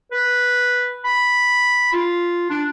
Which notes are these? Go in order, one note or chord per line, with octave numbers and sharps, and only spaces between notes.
B4
B5
F4
D4